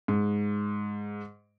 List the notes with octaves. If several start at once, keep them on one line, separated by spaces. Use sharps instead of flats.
G#2